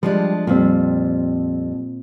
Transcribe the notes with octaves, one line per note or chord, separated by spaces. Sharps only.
F3 G3 G#3 D4
F2 A#2 G3 C4